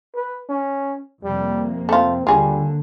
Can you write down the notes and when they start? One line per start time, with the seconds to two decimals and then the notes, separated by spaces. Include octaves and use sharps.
0.15 B4
0.49 C#4
1.24 F2 C3 G3 A#3
1.89 A3 C4 F4
2.27 D#2 D3 G3 F4 G#4